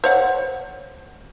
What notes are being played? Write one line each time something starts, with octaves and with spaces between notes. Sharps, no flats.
C5 C#5 F#5